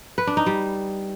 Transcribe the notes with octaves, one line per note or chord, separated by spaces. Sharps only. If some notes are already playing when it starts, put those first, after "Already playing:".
B4
D4
D#4
G3